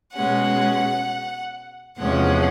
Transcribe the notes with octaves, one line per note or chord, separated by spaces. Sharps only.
B2 G#3 C#4 F#5
E2 C3 F3 G#3 C#4 F#5